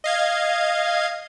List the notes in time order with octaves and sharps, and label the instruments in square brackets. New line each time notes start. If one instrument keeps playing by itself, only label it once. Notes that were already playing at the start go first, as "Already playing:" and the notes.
[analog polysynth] D#5 F5 G#6